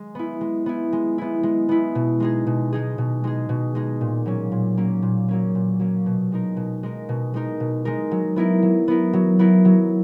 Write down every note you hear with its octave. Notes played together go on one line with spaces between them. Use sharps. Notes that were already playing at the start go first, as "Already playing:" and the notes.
Already playing: G#3
B3 E4
G#3
B3 E4
G#3
B3 E4
G#3
B3 E4
B2
G#3 D#4 G#4
B2
G#3 D#4 G#4
B2
G#3 D#4 G#4
B2
G#3 D#4 G#4
A#2
F#3 A#3 C#4
A#2
F#3 A#3 C#4
A#2
F#3 A#3 C#4
A#2
F#3 A#3 C#4
B2
G#3 D#4 A#4
B2
G#3 D#4 A#4
B2
G#3 D#4 A#4
B2
G#3 D#4 A#4
F#3
B3 E4 A#4
F#3
B3 E4 A#4
F#3
B3 E4 A#4
F#3